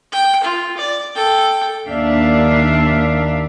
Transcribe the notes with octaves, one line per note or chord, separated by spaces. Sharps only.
G5
F4
D5
A4 G5
D#2 D4 E5 F5